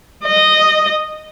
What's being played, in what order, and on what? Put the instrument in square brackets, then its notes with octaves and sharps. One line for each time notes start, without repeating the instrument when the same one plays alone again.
[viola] D#5